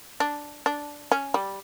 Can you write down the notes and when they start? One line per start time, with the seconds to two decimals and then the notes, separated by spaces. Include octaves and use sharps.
0.20 D4
0.66 D4
1.12 C#4
1.34 G3